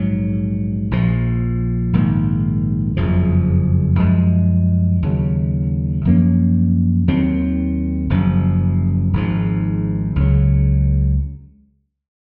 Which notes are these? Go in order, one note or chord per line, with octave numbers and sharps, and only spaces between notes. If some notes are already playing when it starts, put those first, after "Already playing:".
Already playing: A#1 G#2 F#3
A#1 A#2 F3
A#1 G#2 D#3 A#3
F#1 F2 C#3 F3
F#2 F3 G#3
D#2 C#3 F#3
F#2 F3 A#3 C#4
D#2 D#3 F#3 C4
F#1 F#2 F3
G#1 G#2 F3
C#2 C#3 F#3